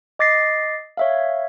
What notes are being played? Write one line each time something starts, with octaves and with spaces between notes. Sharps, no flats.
D#5 D6 A6 A#6 C7
C#5 E5 F5